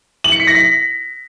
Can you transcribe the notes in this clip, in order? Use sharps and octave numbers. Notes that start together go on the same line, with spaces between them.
F#7
C#7
B6
A#6
B6